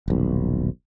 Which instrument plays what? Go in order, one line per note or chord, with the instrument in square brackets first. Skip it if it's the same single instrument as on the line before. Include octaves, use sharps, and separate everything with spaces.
[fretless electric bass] D#1 B1